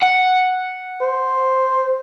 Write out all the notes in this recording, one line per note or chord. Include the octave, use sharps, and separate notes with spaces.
F#5
C5